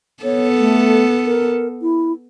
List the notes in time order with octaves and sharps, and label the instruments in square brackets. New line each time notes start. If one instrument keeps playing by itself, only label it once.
[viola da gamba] B3 A4 [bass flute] C#5
[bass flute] A3
A#4
E4